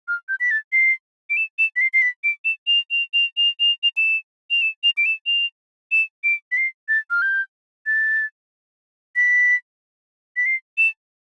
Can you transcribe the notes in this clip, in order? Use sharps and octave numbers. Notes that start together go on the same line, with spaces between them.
F6
G6
B6
A6
C7
D7
E7
E7
B6
C7
C7
B6
D7
E7
F7
F7
F7
F7
F7
F7
E7
F7
E7
F7
D7
E7
F7
E7
D7
B6
C7
A6
F6
G6
A6
B6
B6
C7
E7